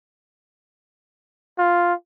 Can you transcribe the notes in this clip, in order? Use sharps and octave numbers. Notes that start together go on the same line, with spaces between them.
F4